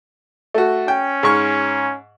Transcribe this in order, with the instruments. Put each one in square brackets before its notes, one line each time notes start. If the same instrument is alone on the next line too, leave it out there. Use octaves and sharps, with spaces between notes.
[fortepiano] A3 F#4
[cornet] C#4 [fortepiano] G5
[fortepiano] G#2 C#6 F6